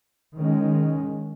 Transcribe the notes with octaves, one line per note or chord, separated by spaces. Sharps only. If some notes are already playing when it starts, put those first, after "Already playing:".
D#3 G#3 C#4